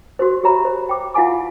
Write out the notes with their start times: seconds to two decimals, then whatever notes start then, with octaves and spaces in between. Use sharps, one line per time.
0.19 F#4 G4 C5
0.44 G4 C#5 E5 A#5 B5
0.65 C5
0.87 C5 G5 D6
1.14 E4 F4 F5 F#5 G#5 D6